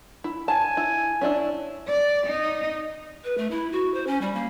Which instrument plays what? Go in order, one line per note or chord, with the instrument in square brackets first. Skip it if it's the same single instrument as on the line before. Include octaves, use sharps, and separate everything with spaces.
[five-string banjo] E4
[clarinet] G#5 [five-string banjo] A5
[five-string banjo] E4
C#4 D4 E4
[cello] D5
D#4
[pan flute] B4
A3
E4
F#4
C5
C#4
G3
A#3